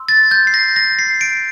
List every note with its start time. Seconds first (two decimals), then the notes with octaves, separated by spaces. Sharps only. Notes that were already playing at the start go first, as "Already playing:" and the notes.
Already playing: C6 E6
0.09 A6
0.31 G6
0.47 C7
0.54 A#6
0.76 A#6
0.99 C7
1.21 D7